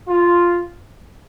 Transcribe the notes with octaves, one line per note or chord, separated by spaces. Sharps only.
F4